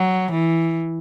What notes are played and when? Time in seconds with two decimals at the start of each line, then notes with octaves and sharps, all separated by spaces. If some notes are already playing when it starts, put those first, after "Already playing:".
Already playing: F#3
0.31 E3